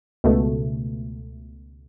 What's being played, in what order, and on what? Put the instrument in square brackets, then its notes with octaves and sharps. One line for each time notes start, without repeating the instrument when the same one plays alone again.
[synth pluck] C#2 B2 A3